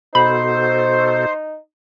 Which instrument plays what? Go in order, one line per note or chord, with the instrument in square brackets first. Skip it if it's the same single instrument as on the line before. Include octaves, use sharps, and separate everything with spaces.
[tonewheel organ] B2 F#4 A4 [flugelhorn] D#4 [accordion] C5 [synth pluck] B5